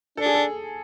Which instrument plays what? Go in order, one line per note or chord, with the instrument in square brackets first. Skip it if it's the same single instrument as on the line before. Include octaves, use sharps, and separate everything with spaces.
[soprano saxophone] D4 [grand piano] A4
[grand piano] G#4
A4